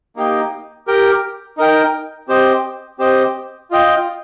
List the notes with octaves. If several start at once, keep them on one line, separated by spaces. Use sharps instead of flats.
A#3 D#4 G4 D#5 G5
G4 A#4 G5
D#4 A#4 G5
C4 G4 C5 D#5 G5
C4 G4 C5 D#5 G5
F4 D#5 G5